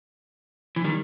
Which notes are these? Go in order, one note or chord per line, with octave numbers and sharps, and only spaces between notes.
E3
D#3 G3